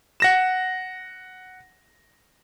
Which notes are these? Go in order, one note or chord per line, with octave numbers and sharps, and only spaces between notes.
F#5 A#6 E7